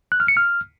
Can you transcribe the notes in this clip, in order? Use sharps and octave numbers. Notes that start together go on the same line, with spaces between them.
F#6
F6
C#7
F6